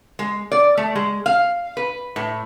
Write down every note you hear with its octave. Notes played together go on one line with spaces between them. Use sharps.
G#3
D5
A3
G#3
F5
B4
A2